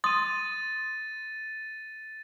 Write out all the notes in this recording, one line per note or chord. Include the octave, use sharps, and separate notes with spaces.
C6 D#6 A6 D#7